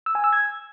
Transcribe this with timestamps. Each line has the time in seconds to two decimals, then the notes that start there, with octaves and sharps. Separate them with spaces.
0.06 E6
0.15 G#5
0.24 E6
0.33 G#6